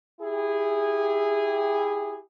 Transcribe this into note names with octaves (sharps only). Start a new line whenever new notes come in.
E4 G4 G#4